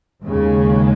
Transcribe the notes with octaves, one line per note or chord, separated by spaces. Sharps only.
D#2 C#3 G#3